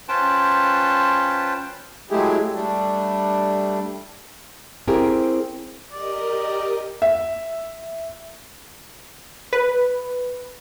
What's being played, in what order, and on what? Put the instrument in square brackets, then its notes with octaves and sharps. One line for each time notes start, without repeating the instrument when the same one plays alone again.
[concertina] C#4 F4 B4 C5 G5 A5
[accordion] F#3 G#3 A3 E4 G4 G#4
G3 A3 D4
[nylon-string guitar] C4 E4 G4 G#4 A#4
[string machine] G4 A#4 D#5 [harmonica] D5
[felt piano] E5
[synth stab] B4